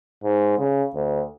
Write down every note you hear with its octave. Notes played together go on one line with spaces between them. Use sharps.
G#2
C#3
D2